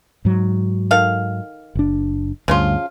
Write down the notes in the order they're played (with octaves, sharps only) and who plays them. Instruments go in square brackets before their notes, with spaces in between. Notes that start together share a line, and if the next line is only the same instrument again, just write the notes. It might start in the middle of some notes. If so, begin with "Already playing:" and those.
[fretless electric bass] G#2 F#3
[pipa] D#3 A4 F5
[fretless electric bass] F#1 D4
[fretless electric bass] D2 G2 [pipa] C#3 F3 F4